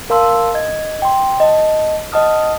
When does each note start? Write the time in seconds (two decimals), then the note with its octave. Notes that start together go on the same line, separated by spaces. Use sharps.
0.10 A#4 F5 A5 C6 E6
0.54 D#5 G#6
1.02 G5 C6
1.40 D#5 A5
2.12 D#5 F#5 A5 D#6 F6